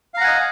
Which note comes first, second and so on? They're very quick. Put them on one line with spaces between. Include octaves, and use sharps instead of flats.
F5 A#5 F#5 G#5 D#5